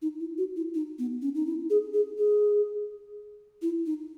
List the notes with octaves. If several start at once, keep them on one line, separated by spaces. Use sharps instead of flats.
D#4
E4
F#4
E4
D#4
B3
C#4
D#4
E4
G#4
G#4
G#4
E4
D#4